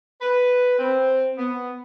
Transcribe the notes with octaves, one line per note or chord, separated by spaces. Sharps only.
B4
C4
B3